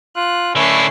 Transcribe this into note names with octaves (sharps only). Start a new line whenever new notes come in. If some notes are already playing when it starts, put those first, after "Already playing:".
F4 F#6
D3 A3 C#4 E4 C7